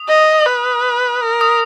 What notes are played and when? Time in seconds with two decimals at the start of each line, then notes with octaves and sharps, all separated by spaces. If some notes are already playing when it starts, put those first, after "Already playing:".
Already playing: D#6
0.08 D#5
0.46 B4
1.22 A#4
1.41 D#6